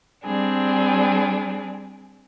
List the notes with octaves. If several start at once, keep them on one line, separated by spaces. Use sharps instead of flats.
G3 C4 D4 G#4